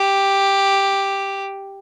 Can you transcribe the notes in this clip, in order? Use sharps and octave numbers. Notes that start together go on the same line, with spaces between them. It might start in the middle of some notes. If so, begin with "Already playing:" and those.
Already playing: G4